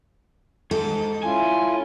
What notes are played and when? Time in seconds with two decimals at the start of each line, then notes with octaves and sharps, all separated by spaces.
0.71 G#2 A4
1.23 C#4 E4 F4 G#5